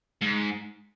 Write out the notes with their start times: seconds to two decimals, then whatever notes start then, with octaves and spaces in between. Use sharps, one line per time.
0.22 G#2